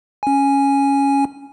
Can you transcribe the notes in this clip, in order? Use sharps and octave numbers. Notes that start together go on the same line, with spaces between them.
C#4 G#5